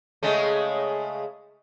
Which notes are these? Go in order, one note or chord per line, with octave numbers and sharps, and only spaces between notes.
C#3 G#3 A3